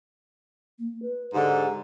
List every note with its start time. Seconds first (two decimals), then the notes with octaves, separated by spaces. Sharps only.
0.79 A#3
1.02 B4
1.34 G#2 D3 G4